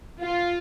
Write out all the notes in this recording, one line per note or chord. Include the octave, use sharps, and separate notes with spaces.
F4